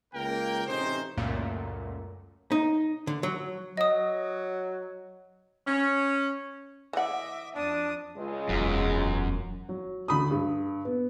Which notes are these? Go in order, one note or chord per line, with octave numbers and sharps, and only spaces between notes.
C#2 A#3 A#4 G5
A1 C3 C#4 D#4 C5
C#2 F#2 A#2 A3 A#3
D#4
D3
F#3
F#3 D#5 D#6
C#4
E3 D#5 E5 F#5 D6
F2 D4 A5 D#6
C#2 G#3
E1 F#2
F#3
D2 B5 D#6
G2
B3